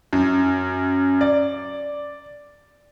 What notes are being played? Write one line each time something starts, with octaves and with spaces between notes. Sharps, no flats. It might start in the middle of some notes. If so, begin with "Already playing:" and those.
F#2
D5